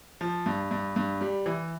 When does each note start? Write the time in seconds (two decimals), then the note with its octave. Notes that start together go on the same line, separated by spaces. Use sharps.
0.21 F3
0.46 G2
0.71 G2
0.96 G2
1.21 G3
1.46 E3